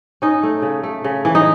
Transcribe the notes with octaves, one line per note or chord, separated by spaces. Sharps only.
C#4 D#4
A3
C#3
A3
C#3
E3
D#4